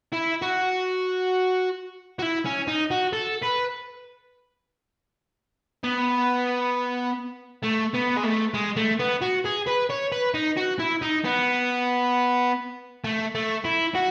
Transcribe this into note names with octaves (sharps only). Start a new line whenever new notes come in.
E4
F#4
F#4
E4
C#4
D#4
F#4
A4
B4
B3
A3
B3
G#3
A3
G#3
A3
B3
F#4
G#4
B4
C#5
B4
D#4
F#4
E4
D#4
B3
A3
A3
E4
F#4